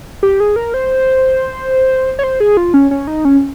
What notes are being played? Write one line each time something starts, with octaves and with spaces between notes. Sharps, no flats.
G4
G#4
A#4
C5
C#5
C5
G#4
F4
C#4
C#4
D#4
C#4